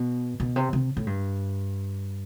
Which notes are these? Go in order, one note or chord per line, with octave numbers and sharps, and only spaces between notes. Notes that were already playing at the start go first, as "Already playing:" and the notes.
Already playing: B2
B2
C3
C3
A2
G2